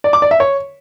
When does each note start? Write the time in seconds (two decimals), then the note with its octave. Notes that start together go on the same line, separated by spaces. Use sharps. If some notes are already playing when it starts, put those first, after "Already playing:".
0.04 D5
0.13 D6
0.22 D5
0.31 E5
0.40 C#5